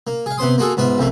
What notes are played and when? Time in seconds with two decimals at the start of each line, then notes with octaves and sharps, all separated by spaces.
0.07 A#3
0.26 G#4 F5
0.38 C3 B3 C5 C6 D#6
0.58 A#3 F4 F#4 G#4 A4
0.77 G#2 B3 F4 E5
0.98 A#1 F2 C3 A3 A#3